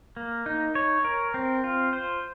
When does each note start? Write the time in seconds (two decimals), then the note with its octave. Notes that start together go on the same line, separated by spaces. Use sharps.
0.17 A#3
0.46 D#4
0.75 C#5
1.04 A#4
1.34 C4
1.64 F4
1.93 C5